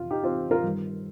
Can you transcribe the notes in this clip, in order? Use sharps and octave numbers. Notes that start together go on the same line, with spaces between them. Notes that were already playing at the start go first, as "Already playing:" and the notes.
Already playing: F2 C3 F3 F4
D#4 G4
C4 F4
F4 A#4
G2 D#3 G3